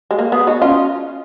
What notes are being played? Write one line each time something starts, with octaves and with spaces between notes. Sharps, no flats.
G#3
A#3
B3 G#4
D#4 F#4
C#4 F4